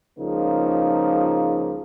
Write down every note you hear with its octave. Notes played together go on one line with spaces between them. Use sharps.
C#2 C#3 F3 A#3 D#4